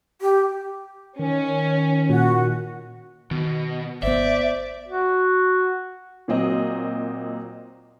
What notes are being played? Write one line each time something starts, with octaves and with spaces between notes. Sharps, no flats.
G4
D#3 C#4
A#2 F#4
B2 D#3
G#1 B3 C5 D5 E5
F#4
A#2 F#3 C4 D#5